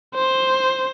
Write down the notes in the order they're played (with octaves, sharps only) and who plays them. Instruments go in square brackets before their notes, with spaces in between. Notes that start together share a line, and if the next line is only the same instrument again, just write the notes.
[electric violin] C5